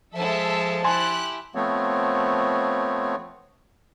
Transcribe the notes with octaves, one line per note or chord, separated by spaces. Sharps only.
F3 G#3 A4 E5 A5
E4 G4 G#5 A5 C6 F#6
F3 A3 B3 C4 C#5